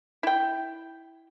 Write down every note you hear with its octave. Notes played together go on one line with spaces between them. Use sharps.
E4 G5